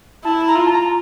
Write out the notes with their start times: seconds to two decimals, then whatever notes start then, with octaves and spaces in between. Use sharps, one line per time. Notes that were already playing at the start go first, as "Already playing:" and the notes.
0.24 E4 A5
0.48 A#5
0.55 F4
0.66 A5
0.71 A#5